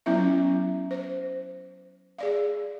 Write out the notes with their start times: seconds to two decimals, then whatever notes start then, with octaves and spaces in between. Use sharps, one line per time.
0.06 F#3 B3 C#4 E4 E5
0.91 C5
2.18 G#4 D5 F5